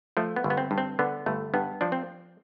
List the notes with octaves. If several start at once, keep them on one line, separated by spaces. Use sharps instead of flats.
F3 A3
B3
G1
B3
C4
G2
C4
D3 B3
G1 A3
G2 B3
F3 D4
C4